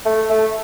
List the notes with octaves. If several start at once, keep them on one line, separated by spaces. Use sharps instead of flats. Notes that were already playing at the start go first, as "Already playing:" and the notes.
A3
A3